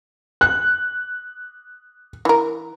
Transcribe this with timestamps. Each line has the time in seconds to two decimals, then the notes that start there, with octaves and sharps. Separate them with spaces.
0.41 F#6
2.25 E3 A#4